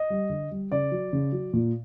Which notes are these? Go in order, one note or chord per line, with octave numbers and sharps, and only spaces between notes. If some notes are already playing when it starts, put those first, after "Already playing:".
Already playing: D#5
G3
D3
G3
C#3 D5
F#3
C#3
F#3
A#2